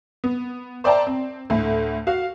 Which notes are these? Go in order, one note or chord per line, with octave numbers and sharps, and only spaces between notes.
B3
C5 D5 E5 G5 A5 A#5
C4
D2 A2 A3
F#4 F5